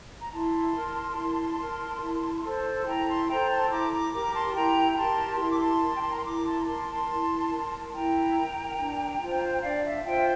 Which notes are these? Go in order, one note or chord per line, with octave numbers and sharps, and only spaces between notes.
A#5
E4 A5 C6
A#4
E4
A#4
E4
A4 C5
C6
E4 G5 A#5
A5 C6
A4 C5 G5 A#5
A#5
A5 C6
E4 A#5 D6
A#5 D6
G4 A#4 A#5 D6
A5 C6
A5
E4 G5 A#5
A#5
G4 A#4 A5 C6
E4 C6
D6
A5 C6
A#4
G5
A5
A#5
C6
E4 A#5 D6
A5 C6
A#5
A#4 A5 C6
A5 C6
E4
A#4
E4 G5 A#5
A#4
D4
F4 C5
G5
D4 D5 F5
E5
F4 C5 E5 G5